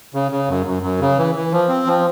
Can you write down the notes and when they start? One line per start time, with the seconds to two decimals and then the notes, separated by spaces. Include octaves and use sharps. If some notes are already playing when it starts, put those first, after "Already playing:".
0.14 C#3
0.32 C#3
0.49 F#2
0.66 F#2
0.83 F#2
1.00 C#3
1.17 E3
1.35 E3
1.52 F3
1.69 C4
1.86 F3